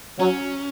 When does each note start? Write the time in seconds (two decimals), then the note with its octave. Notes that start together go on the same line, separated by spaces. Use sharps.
0.19 F#3 C#4